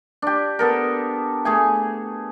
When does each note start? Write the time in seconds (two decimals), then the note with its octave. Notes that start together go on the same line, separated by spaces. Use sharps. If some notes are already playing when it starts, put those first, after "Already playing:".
0.22 D4 G4
0.59 B3 A4 A#4
1.45 A3 G#4 G#5